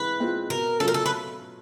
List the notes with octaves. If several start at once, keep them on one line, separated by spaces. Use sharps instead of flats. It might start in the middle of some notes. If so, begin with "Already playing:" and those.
Already playing: E3 G#3 C4 B4
G#3 C4 F4
B2 A#4
F#3 A3 C#4 F4 A4
A#4
A4
B4